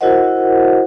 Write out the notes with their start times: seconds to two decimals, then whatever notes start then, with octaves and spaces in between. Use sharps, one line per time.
0.01 E4 F#4 A#4 C5 D#5 F#5